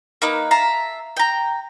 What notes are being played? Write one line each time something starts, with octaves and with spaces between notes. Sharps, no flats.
A#3 D#4 B4
E5 F5 A5 A#5
G5 A#5